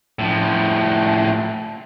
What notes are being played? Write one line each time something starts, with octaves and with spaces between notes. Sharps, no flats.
A2 F3